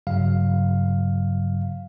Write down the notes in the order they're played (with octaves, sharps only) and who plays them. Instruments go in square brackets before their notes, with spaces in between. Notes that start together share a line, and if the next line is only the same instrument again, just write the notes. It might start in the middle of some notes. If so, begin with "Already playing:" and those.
[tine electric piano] G2 C#3 F#3 F5